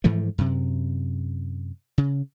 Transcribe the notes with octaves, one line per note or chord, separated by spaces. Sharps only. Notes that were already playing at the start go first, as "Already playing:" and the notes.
G#2 E3 F3 A3
F#2 C3
C#3